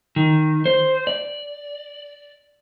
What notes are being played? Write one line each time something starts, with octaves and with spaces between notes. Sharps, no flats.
D#3
C5
D5